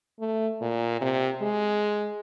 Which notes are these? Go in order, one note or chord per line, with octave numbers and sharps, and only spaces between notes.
A3
A#2
C3
G#3